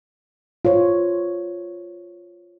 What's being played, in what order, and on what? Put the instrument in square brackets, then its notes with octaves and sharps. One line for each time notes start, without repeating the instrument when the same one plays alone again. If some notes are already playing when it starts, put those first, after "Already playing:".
[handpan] F4 C5 C#5